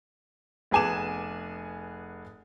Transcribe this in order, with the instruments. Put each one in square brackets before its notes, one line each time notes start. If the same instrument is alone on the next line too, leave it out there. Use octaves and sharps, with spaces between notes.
[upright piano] F1 B3 G#4 G#5 D6 E7